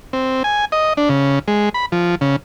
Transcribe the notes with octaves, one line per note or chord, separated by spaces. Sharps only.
C4
G#5
D#5
D4
C#3
G#3
B5
F3
C#3